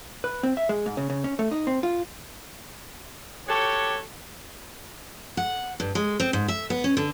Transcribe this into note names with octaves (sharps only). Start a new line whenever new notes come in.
B4
C4
E5
G#3
G#2
C#3
C#3
C#4
A3
D#4
C4
F4
F#4 G4 A4 C#5
F#5
G2
G#3
C4
G#2
E5
B3
C#4
D3